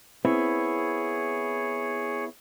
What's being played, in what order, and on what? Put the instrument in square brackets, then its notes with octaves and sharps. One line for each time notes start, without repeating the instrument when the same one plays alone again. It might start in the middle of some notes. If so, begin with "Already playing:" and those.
[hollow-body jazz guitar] B3 C4 E4 [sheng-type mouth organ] G#4 C#5